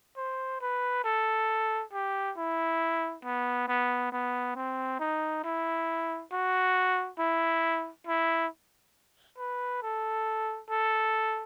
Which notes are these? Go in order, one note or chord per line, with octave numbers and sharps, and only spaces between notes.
C5
B4
A4
G4
E4
B3
B3
B3
C4
D#4
E4
F#4
E4
E4
B4
A4
A4